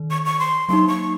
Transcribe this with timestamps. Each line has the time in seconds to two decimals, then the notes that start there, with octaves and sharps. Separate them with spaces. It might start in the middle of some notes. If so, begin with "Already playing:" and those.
Already playing: D#3
0.11 C#6
0.25 C#6
0.39 C6
0.69 F#3 A#3 D#4 C6
0.88 C#6